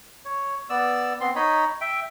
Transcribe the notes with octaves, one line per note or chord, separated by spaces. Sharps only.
C#5
B3 D5 E6
B3 C4 C6
D#4 C#5 D#5 B5
E5 G5